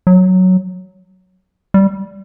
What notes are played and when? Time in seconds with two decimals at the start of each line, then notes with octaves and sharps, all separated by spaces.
0.07 F#3
1.74 G3